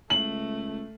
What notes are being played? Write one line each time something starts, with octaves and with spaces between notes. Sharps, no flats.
C#2 A3 F#7